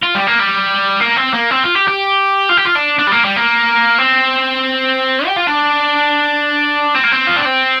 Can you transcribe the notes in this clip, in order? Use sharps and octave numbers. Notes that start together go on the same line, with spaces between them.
F4
G3
A#3
G3
A#3
C4
A#3
C4
F4
G4
G4
F4
G4
F4
D4
D4
G3
A#3
G3
A#3
C4
G4
F4
D4
C4
A#3
C4
F4
D4
C4